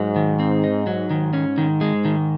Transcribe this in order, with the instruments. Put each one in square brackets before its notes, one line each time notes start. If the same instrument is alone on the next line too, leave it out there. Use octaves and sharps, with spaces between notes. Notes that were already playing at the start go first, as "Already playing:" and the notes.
Already playing: [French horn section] G#2 [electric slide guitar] F#3
[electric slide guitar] D#3
C4
D#4
F#3
[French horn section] G#2 [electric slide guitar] D#3
[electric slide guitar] C#4
D#3
G#3
D#3